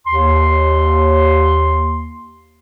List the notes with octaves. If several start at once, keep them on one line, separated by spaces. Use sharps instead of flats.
D#2 C6